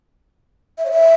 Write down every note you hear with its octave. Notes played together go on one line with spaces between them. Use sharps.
E5
C#5
E5